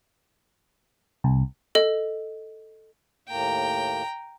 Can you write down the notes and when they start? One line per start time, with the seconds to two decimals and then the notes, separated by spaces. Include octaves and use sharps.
1.24 C2
1.75 A4 D#5
3.28 D#2 A2 A#3 G5 A#5